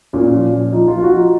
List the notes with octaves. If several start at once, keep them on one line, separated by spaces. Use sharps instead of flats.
A#2 C#4
F3
F3
F3 D#4
F4
F3
F4
F#4
F3 D#4